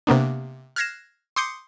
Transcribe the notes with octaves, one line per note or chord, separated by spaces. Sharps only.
C3 A#3 B3 D4
F6 F#6 G#6 A#6 C7 E7
C6 D6 D#6 G6 C7 C#7